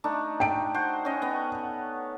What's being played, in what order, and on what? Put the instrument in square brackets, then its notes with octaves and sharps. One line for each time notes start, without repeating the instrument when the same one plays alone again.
[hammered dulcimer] A3 D4 D#4
[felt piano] G5 D7
[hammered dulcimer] F#4 C5
C#4 D#5
B3